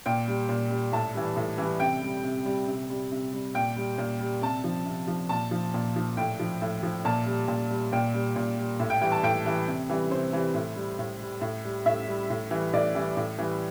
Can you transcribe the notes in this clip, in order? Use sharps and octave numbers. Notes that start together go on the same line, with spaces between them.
A#2 G5
G3
A#2
G3
A2 A5
E3 G3
A2
E3 G3
C3 G5
G3
C3
G3
C3
G3
C3
G3
A#2 G5
G3
A#2
G3
C3 A5
F3
C3
F3
A#2 A5
F3
A#2
F3
A2 G5
F3
A2
F3
A#2 A5
G3
A#2
G3
A#2 G5
G3
A#2
G3
A2
G5
E3 G3 G5
A5
A2 G5
E3 G3
C3
E3 G3
C3 C5
E3 G3
A2
G3
A2
G3
A2
G3
A2 E5
G3
A2
E3 G3
A2 D5
E3 G3
A2
E3 G3